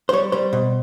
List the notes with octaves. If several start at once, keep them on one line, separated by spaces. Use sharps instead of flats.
C5
G3 C#5
G3 C5
B2